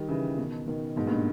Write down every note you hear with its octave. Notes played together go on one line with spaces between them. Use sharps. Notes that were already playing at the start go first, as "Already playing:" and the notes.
Already playing: D#3 G3
C#3 E3
B2 D#3
B2 D#3
G#2 B2
G2 A#2